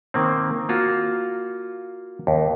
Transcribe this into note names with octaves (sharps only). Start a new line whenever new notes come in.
D#3 A#3 C4
A#3 F4 F#4
D#2